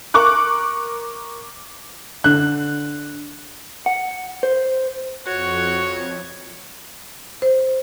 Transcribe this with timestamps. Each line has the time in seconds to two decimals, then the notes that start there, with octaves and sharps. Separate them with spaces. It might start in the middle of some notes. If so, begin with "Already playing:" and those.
0.14 A#4 C#6 D6 F#6
2.24 D3 F#6
3.86 F#5
4.43 C5
5.27 F2 F#4 C#5
7.42 C5